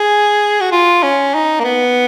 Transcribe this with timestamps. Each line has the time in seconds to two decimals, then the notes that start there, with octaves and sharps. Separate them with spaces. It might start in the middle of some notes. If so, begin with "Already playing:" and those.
Already playing: G#4
0.61 F#4
0.72 F4
1.03 C#4
1.34 D#4
1.60 A#3
1.64 B3